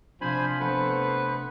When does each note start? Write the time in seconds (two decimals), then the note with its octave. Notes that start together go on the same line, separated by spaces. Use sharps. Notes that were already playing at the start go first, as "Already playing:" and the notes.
0.21 C3 F3 D4 C5 G#5 B5
0.60 A3 B3 B4 C5